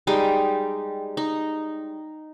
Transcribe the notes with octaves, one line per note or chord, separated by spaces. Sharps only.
G3 G#3 D#4 G5
D#4